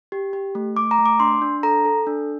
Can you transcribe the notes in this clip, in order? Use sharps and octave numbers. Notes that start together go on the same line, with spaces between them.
G4
G4
A3
A3 D6
A#5
A3
D6
D4 C6
D4
A4 A#5
A4
D4